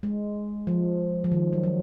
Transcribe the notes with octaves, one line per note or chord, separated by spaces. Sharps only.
G#3
F3
F3
D#3
F#3
F#3